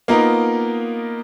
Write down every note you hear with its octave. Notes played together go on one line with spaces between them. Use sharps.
A#3 B3 D#4 F4 A#4